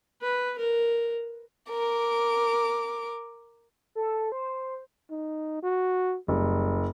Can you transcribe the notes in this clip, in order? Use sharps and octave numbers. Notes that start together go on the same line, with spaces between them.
B4
A#4
A#4 D6
A4
C5
D#4
F#4
F#1 G3